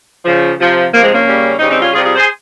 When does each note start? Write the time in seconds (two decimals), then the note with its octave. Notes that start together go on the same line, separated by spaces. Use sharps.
0.25 C#3 F3
0.58 C3 F3
0.92 C3 F3 A#3
1.03 G#3 C4
1.14 A#3 C#4
1.26 C#3 G3
1.59 C#3 G3 C4 D#4
1.71 C4 D#4
1.82 C#4 F4
1.93 C3 G3 F4 G#4
2.04 F4 G#4
2.16 G#4 C5